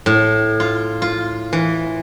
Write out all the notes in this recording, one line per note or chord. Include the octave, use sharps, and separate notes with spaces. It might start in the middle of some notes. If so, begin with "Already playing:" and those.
A2
F4
F4
E3